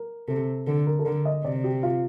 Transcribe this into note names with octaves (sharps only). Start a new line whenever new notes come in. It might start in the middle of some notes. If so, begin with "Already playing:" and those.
Already playing: A#4
C3 A4
D3 A4
A#4
A4
D3 A#4
D#5
C3 D5
G4
F4